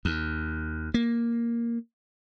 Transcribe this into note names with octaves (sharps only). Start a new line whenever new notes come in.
D#2
A#3